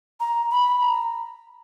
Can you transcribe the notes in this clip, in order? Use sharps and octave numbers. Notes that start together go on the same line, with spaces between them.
A#5
B5
A#5